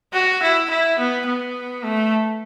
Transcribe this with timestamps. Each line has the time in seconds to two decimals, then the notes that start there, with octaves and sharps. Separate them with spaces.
0.14 F#4
0.43 E4
0.70 E4
0.99 B3
1.27 B3
1.83 A3